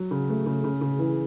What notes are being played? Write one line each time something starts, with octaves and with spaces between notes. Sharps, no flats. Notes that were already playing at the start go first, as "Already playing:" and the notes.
Already playing: F#3
C#3
A3
C#3
C#3
C#3
E3